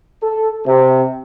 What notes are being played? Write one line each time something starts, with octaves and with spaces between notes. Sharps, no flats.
A4
C3